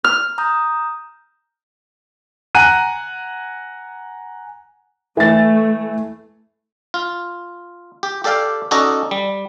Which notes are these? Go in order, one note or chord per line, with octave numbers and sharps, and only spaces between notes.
F6
A#5 D#6 G6
F#5 G#5 A#5 F#6 D#7
E3 A3 A6
F4
G4
G4 A4 D5 F5 G5
C#4 D#4 F#4 A4 D5 D#5
G3